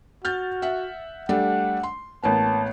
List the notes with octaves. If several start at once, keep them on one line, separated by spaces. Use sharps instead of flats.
F#4 F6 G6 A6
E5 F#5
G3 A3 D4 F#5
C6
A1 A#3 B3 A5